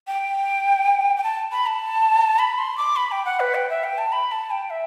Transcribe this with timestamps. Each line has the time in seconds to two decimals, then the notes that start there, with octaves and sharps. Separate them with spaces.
0.07 G5
1.17 G5
1.24 A5
1.52 B5
1.66 A5
2.39 B5
2.58 C6
2.77 D6
2.96 B5
3.11 G5
3.25 F#5
3.40 B4
3.55 G5
3.69 E5
3.84 G5
3.98 A5
4.12 B5
4.32 A5
4.51 G5
4.70 E5